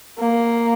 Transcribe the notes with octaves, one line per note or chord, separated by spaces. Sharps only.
A#3